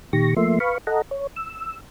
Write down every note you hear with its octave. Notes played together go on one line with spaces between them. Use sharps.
A#2 D#3 G4 C#6 A#6
F3 A3 A#3 E5 C6
B4 F5 B5 C#6
A4 D#5 F#5 A#5
C#5
E6